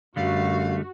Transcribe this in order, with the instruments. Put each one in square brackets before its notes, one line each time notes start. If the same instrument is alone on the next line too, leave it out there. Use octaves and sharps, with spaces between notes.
[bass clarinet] F#2 [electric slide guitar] D3 G3 A3 [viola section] F#4 [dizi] F5